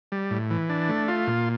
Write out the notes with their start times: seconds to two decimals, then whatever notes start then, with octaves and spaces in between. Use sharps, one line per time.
0.12 G3
0.31 A2
0.50 E3
0.70 D4
0.89 A3
1.08 F4
1.27 A#2